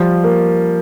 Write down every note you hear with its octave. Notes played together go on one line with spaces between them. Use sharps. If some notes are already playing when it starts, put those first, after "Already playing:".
Already playing: F3 G3
A#3